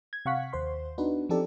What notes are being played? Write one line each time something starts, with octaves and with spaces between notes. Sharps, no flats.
G#6
C3 F5 F#5 C#6 F#6 B6
D#2 C5 C6
B3 D4 D#4 F#4 B4
F3 C4 D#4 G4 A4 D5